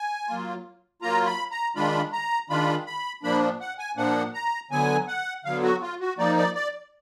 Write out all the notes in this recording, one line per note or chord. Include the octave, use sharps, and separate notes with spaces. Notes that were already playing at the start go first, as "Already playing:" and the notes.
Already playing: G#5
F#3 A#3 F4
F#3 A#3 F4 A#5
B5
A#5
D#3 G#3 D4 F4 B5
A#5
D#3 G#3 D4 F4 B5
B5
A#2 F3 A#3 D4 B5
F#5
G#5
A#2 F3 A#3 D4 F#5
A#5
D3 F#3 B3 G#5
F#5
D3 F#3 B3 F5
F#4
F4
F#4
F3 A#3 D#4 D5
D5
D5